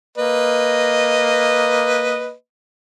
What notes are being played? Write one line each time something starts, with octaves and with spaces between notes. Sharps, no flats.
A#3 B4 D#5